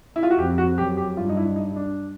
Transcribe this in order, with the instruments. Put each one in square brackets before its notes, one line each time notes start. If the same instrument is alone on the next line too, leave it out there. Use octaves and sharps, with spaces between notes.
[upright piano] E4
F4
F#4
[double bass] F2 [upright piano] G4
[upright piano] F#4
[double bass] F#2 [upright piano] G4
[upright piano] G4
[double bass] G2 [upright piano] F4
[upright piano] D#4
E4
D#4
D4